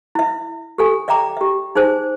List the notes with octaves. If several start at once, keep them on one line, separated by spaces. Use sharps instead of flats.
E4 E5
G4 A4 G#5
D5 E5 G5 A#5 D6
G4 E5
D#4 G#4 C5 G#5